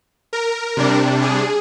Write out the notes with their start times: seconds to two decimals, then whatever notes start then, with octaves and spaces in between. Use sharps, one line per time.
0.33 A#4
0.77 C3 G3 D4
1.22 G#4